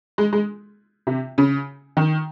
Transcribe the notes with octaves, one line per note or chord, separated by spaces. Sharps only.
G#3
G#3
C3
C#3
D#3